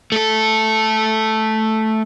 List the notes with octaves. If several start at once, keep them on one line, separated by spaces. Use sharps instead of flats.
A3 A4